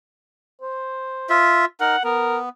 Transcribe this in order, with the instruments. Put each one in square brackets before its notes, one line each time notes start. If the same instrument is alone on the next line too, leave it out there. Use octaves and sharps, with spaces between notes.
[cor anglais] C5
[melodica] F4 E5
[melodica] D#4 A#4 [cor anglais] F#5
[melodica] B3 [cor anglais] A#4